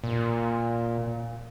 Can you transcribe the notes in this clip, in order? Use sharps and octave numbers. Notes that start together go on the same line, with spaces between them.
A#2